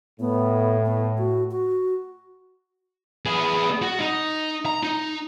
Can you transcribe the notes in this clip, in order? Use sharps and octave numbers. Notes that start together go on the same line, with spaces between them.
A2 B3
B3
F#4
F#4
B3 G#4
F#4 F#5
D#4
A#5
D#4